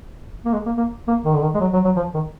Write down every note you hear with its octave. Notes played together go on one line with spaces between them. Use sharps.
A#3
G#3
A#3
A#3
A#3
D#3
D3
D#3
G#3
F#3
F#3
F#3
F3
D#3